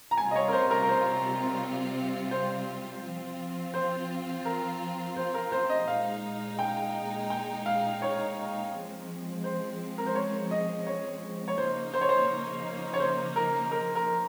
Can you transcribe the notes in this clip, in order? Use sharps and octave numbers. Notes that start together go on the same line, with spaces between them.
A#5
C3 G3 C4 F4 G#5
D#5
C#5
A#4
C5
A#4
A#4
C5
C5
F3 C4 F4
C5
A#4
C5
A#4
C5
D#5
A#2 G#3 D#4 F5
G5
G5
F5
C#5
F3 G#3 C4
C5
A#4
C5
C#5
D#5
C#5
C#5
C#3 F3 A#3 D#4 C5
C5
C#5
C5
C#5
C5
A#4
A#4
A#4